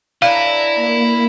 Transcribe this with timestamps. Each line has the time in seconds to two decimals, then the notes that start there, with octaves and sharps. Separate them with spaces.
0.22 A2 D4 E4 B4 F5 A#5
0.75 A#3